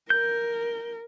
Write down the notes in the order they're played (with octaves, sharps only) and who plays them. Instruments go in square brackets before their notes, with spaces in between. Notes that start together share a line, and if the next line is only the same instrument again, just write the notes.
[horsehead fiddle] A#4 [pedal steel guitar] G6